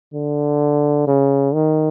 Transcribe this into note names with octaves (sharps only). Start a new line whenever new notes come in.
D3
C#3
D#3